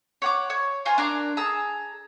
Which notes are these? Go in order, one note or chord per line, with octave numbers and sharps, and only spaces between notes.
C#5 F#5 D6
C#5
F4 C5 G#5 A#5
D4 A#4 D6
G#4 A5 A#5 E6